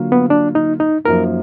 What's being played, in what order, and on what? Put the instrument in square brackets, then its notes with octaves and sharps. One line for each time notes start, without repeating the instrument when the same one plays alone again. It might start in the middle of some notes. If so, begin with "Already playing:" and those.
Already playing: [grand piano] D3 F#3 A#3 F4
[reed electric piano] B3
D4
D#4
D#4
[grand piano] F#2 F3 A#3 D#4 [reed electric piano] A#4